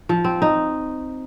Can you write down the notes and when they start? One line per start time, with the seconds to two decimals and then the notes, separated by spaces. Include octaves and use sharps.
0.09 F3
0.25 C4
0.42 D#4